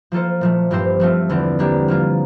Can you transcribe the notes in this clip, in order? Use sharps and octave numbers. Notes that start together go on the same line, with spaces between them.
F3 A#3 F4 A4 C5
A#2 F3 A3
G2 F3 C4 G4 C5
F3 A3 C4 F4
E2 D3 F3 C4
G3 A#3 D4 G4
F3 A#3 F4